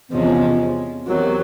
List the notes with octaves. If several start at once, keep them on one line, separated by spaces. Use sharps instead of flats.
E2 C3 F3 G#3 C#4
E2 C3 D#3 F#3